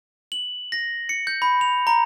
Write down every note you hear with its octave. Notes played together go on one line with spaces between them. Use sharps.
F#7
A#6
C#7
G6
B5
F7
A#5